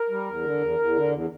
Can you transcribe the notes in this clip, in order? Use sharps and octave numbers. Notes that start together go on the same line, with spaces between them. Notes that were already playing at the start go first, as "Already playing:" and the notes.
Already playing: A#4
G3
E2
D3
E2
E2
D3
E2